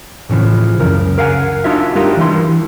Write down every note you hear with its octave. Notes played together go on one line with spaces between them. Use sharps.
A2 C#3 E3 F3
C#2 F#2 C#3 A#4
A#4 F5 F#5 G#5
D4 D#4 F4 F#4 E5
G3 D4 D#4 F4 G4 A#4
E3 E4 C6